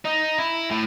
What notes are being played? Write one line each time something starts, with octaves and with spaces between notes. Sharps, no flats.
D#4
E4
A2